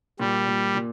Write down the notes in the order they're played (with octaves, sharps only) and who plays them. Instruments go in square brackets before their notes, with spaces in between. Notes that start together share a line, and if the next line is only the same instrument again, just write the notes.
[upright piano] A#2 [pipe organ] G3
[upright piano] A#2
A#2